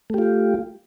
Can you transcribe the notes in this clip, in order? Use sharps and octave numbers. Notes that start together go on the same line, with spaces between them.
A3 F4 G4